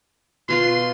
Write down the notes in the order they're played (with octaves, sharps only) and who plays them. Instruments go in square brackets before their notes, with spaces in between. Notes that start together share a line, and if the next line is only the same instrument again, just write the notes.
[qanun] B2 F4 B4 [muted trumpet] C6